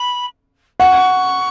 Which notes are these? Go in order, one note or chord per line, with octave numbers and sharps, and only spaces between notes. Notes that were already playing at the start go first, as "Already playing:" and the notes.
Already playing: B5
F#5 C#6